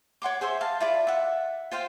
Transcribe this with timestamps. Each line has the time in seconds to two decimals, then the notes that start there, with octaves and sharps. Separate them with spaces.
0.22 C#5 F#5 C6 D6
0.41 G#4 C5 E5 C6
0.61 F5 A5
0.80 E4 F4 D5
1.07 E5 F#5
1.71 F4 C5 F5 G5